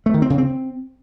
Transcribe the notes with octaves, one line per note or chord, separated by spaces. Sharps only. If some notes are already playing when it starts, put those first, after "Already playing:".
A3
D#3
C4
C#3
C4